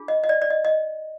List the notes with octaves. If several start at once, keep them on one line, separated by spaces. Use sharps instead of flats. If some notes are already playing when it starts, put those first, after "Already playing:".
Already playing: D4 F4 G#4
D#5
D#5
D5
D5
D#5
D#5